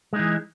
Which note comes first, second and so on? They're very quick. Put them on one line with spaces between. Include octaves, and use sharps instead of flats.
G#3 D#4 E3